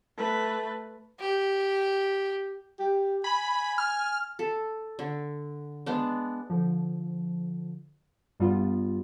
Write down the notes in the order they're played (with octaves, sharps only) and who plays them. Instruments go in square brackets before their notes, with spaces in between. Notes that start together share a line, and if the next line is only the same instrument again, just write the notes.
[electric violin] A3 B4
[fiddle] G4
[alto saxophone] G4
[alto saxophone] G#5 [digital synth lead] B5
[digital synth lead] F6
[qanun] A4
D3
G#3 B3 D4
[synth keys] D3 F3
G2 G3 B3 F4